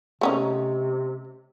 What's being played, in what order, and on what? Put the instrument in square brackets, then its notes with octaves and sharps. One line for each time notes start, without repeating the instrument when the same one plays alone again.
[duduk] C3 [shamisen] A3 C#4 D#4